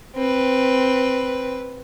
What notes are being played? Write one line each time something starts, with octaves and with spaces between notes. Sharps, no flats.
C4 B4